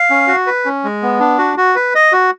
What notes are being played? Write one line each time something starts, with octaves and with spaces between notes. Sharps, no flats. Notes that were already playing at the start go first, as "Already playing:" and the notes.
Already playing: F5
C#4
F#4
B4
C#4
G#3
B3
D4
F#4
F#4
B4
D#5
F#4